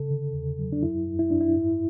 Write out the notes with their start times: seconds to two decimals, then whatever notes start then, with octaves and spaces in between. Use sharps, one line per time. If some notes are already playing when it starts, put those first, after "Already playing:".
Already playing: C#3 A4
0.10 D3
0.34 E2
0.59 F#3
0.72 D4
0.82 F#2 E4
1.07 F#2
1.19 E4
1.31 F#2 D4
1.41 E4
1.56 G#2